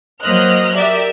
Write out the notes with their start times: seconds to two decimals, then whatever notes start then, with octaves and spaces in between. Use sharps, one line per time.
0.22 F#3 A#3 C5 D#5 F6 F#6
0.75 G4 A#4 D5 E5